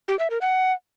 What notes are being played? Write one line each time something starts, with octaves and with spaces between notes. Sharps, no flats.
G4
E5
A#4
F#5